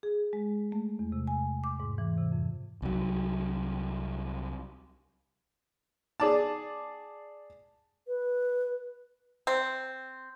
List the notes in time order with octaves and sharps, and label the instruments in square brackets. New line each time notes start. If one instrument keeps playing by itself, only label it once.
[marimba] G#4
G#3
A3
E2
C3
G#5
D6
G#2
E3
C3
F2
[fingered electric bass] C2 F#3
[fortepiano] G#4 D5 A5
[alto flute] B4
[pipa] C4